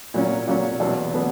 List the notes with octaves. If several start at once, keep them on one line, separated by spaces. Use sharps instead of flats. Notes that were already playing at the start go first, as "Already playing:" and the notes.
A#2 F#3 C#4
A#2 F#3 C#4
E2 B2 F#3 B3
B2 F#3 B3